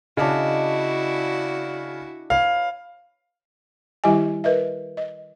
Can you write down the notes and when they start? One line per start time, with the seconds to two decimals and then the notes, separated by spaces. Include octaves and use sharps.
0.17 C#3 D4 E4 F#4 D#5
2.30 B4 C#5 F5
4.04 D#3 G3 E4 G4 D#5 G#5
4.44 A#4 B4 D#5 E5
4.97 D#5